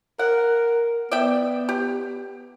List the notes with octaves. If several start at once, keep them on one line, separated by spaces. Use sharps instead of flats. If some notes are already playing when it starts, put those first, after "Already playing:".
A#4 F#5
B3 D5 E5 G5
G4